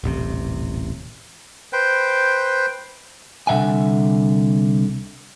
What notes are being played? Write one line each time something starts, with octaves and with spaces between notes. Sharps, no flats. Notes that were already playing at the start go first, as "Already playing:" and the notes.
D#1 A1 C3
B4 C5 G5
C2 D3 D#3 E5 F#5 G#5